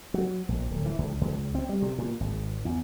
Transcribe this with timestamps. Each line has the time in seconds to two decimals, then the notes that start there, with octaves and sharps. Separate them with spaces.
0.14 F#3
0.49 A#1
0.71 D1
0.86 E3
0.98 C#2
1.21 C#2
1.55 C4
1.69 G3
1.82 C3
1.98 A#2
2.20 G#1
2.65 E2